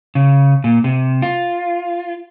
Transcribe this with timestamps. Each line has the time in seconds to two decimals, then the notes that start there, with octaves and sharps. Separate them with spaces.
0.15 C#3
0.64 A#2
0.84 C3
1.22 F4